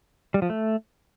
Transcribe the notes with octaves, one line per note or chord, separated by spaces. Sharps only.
G3
F3
A3